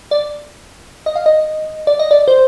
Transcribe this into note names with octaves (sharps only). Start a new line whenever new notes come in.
D5
D#5
F5
D#5
D5
D#5
D5
C5